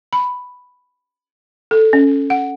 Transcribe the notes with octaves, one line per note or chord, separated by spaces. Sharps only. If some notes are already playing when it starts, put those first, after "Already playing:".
B5
A4
C#4
F#5